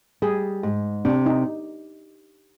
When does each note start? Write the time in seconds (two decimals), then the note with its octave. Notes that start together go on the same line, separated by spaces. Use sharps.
0.22 G3 G#4
0.63 G#2
1.05 C3 D4
1.26 D#4